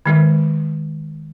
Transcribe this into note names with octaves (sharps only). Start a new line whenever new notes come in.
D#3 G#3